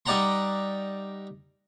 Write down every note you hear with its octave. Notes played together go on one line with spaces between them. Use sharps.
G3 D#4 D5 F#5 A#5 C6